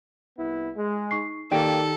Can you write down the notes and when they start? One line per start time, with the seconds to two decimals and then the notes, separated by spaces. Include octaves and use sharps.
0.37 C2 B3 E4
0.76 G#3
1.11 D#4 C#6 C7
1.51 D#3 A#3 G4 A4 D5 G5 D7